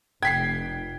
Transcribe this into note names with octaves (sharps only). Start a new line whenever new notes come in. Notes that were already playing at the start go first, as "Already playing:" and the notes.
F1 G5 G#6 B6 C7